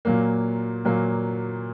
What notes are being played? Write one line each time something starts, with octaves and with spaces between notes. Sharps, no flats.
A#2 F#3 A#3
A#2 F#3 A#3